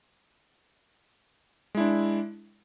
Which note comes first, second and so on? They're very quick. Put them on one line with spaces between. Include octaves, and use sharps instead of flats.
G#3 E4 D4